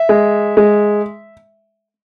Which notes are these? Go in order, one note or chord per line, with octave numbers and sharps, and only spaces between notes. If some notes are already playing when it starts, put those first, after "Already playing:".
Already playing: E5
G#3
G#3